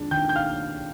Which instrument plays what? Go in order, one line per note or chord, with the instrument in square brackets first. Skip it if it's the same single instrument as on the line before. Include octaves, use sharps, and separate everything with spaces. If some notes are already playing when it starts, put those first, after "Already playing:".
Already playing: [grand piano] F2 D#3 G#3 D4
D#3 G5 G6
G6
F5 F6